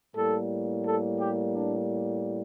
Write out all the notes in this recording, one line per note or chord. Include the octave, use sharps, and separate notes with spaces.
A2 G3 A#3 A4
A4
G4
D4